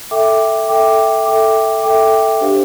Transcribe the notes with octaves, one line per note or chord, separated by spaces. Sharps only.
A4 E5 G5 D6
A4 E5 G5 D6
A4 E5 G5 D6
A4 E5 G5 D6
D4 G4 C5 F5